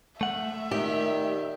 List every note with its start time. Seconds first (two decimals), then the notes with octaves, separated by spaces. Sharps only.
0.21 A3 E5 F#5
0.71 A#2 D#3 G4